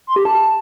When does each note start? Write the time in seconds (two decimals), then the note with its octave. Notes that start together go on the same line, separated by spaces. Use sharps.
0.07 C6
0.16 G4
0.25 A5